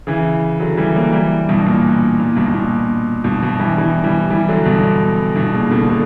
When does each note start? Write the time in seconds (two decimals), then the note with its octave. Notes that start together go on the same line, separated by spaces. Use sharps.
0.07 C#3 E3
0.60 D3 F#3
0.77 E3 G3
0.96 F#3 A#3
1.13 E3 G3
1.49 G2 B2
1.66 A#2
2.20 A#2
2.37 G2 B2
2.48 B2
2.54 A#2
3.24 G2 B2
3.42 G2 B2
3.59 E3 G3
3.78 E3 G3
4.04 E3 G3
4.30 E3 G3
4.49 D3 F#3
4.65 G2 B2
4.83 G2
5.36 G2 B2
5.54 A#2 C#3
5.71 B2 D3
5.89 B2 D3